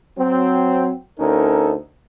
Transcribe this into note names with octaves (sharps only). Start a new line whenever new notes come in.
F#3 C4
D2 C#4 D#4 A4 A#4